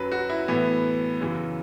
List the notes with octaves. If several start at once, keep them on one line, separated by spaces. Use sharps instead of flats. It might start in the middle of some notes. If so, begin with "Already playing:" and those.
Already playing: F#2 F#3 B4
F#4
E4
A2 E3 B3
F#2 C#3 E3